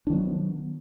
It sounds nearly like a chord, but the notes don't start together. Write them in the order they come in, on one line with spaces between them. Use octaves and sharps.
D4 D#3 F#3 B3